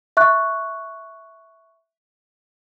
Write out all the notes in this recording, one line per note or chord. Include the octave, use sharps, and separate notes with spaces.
E5 C#6 F#6